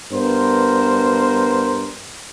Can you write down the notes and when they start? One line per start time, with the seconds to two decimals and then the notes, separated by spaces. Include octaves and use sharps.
0.12 G2 B3 A#4 C5